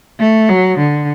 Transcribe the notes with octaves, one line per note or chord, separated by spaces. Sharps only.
A3
F#3
D3